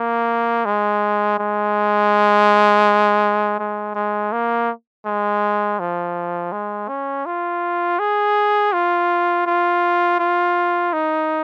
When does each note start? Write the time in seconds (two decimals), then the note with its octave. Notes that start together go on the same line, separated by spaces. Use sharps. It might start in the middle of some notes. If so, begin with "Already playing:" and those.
Already playing: A#3
0.65 G#3
1.39 G#3
3.59 G#3
3.95 G#3
4.32 A#3
5.06 G#3
5.79 F3
6.52 G#3
6.89 C#4
7.26 F4
7.99 G#4
8.73 F4
9.46 F4
10.19 F4
10.93 D#4